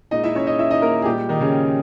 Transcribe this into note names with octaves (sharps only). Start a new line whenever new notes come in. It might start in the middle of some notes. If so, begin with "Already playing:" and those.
A#2 G#3 D#4 D#5
E4 E5
C#4 C#5
D#4 D#5
E4 E5
D#4 D#5
A#3 A#4
G#4
A#2 G3 G#3 G4
D#3 D#4
C#3 C#4